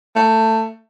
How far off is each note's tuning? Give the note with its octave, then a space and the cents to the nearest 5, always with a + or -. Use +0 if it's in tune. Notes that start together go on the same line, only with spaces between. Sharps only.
A3 +20